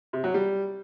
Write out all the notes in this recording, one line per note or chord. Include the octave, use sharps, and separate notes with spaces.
C3
F#3
G3